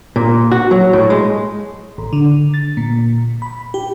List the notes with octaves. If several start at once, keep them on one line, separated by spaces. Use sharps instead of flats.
A#2
F#4
F#3
A2
G#3
A1
D3
A6
A#2
B5
G4